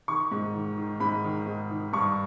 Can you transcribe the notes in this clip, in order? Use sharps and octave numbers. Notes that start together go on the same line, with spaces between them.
D#3 C#6
G#2
D#3
D#3
G#2 B5
D#3
G#2
D#3
G2 C#6